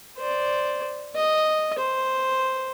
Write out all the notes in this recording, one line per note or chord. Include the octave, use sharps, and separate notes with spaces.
C5 D5
D#5
C5